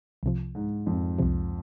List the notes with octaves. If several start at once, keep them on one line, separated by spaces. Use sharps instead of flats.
C2 C3 F3
G#2
F2
C2 C3 F3